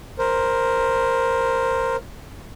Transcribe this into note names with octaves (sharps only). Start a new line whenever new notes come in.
A#4 C5